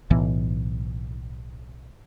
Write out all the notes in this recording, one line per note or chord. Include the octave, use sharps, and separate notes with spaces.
B1 A2 E3 B3